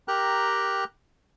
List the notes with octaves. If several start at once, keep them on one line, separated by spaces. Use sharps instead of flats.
G4 A#4 G5 A#5 F#6